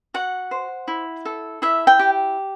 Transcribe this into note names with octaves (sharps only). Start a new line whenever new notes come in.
F#4 F#5
C5
E4
A4
E4 E5
G5
G4